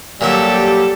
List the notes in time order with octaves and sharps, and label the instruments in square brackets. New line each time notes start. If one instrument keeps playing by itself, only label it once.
[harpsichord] A#2 F#3 E5 [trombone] G3 [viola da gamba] G4 A4